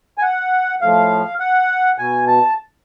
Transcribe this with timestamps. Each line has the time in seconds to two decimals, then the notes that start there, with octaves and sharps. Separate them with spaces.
0.18 G#5
0.22 F#5
0.81 A2 F3 F5
1.40 F#5
1.98 B2 G#5
2.27 A5